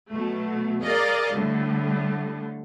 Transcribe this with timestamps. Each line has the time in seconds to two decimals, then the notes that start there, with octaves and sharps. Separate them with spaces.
0.10 B2 F#3 A3
0.81 G#4 A#4 D5 D#5 F5
1.32 A2 D3 G3